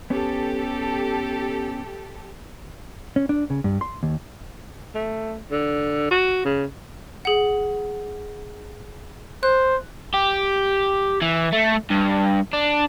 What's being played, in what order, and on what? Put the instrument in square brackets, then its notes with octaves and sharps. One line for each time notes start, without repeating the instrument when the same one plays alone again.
[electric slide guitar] B3 C#4 [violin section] G4 A4
[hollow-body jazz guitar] C#4
D4
C#3
G2
C6
D#2
[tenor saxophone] A3
D3
F#4
C#3
[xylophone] G#4 F#5
[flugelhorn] C5 [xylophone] F#6
[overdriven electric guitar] G4
E3
A3
G2
D4